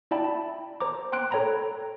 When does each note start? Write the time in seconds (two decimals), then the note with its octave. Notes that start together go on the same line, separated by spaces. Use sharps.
0.11 E4 D5 E5 G5 A5 B5
0.24 A5 B5
0.80 C5 A#5 D6
1.12 G5 C6 F#6 D7
1.31 A4 C#5 G5 A#5 B5